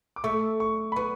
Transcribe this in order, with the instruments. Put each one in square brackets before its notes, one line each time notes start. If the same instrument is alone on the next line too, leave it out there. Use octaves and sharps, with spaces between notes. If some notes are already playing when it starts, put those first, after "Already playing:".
[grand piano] D6
[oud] A3 [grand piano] C#6
[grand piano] C#6
B5
[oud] B3 [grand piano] C#6